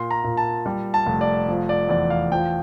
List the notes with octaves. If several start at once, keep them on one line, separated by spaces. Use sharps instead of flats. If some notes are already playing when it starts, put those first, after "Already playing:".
Already playing: A#2 C6
A#5
A#2
A5
G3
A5
F1
D5
F3
D5
E2 D5
F5
F3 G5